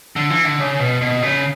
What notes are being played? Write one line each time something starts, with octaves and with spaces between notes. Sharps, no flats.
D3
E3
D3
C#3
B2
B2
C#3